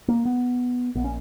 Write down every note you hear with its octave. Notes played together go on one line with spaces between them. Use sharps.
A#3
B3
A#1 A#2 B3
C#4